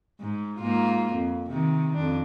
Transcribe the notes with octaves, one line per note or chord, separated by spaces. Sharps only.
G#2
G#2 A#3 F4
F2
C3 D#3
F2 D4